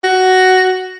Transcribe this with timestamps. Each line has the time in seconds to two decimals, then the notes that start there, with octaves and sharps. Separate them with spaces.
0.04 F#4